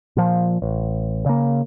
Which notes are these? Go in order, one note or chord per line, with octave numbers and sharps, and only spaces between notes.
A#2 F3
A1
C#3 A#3